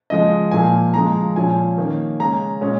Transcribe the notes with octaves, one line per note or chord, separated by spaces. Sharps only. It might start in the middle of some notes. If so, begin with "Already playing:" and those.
C#3 F3 G#3 D#5
A#2 F3 A#3 G#5
C#3 F3 G#3 A#5
A#2 F3 C#4 G#5
D#3 A#3 C#4
C#3 G#3 C#4 A#5
A#2 G#3 C#4